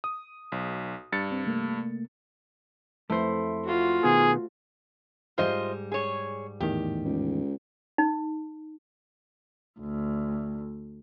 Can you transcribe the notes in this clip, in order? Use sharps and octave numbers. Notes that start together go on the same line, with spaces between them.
D#6
B1
G2 A6 C#7
C2 C4
C3 A3 A#3
F2 A3 E4 C5
F4 F#4
B2 D#3 B3 G#4
G#2 G3 F4 C5 D#5
G#4 C#5
E2 A2 D#3 G4
C#2
D#4
D2